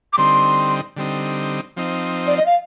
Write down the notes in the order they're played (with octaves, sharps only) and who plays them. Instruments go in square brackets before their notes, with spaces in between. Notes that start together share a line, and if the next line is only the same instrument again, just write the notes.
[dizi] D6
[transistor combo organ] D3 G3 C4 D#4 [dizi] C6
[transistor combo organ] D3 G3 C4 D#4
F3 C4 D#4
[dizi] D5
D#5
F5